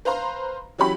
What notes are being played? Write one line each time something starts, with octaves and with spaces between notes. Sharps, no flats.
B4 C5 F5 A#5 C6
E3 F#3 C#4 G4 B5